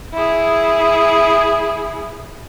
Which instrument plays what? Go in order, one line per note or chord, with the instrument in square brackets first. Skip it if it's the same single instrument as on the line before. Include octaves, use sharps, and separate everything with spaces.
[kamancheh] E4 G#4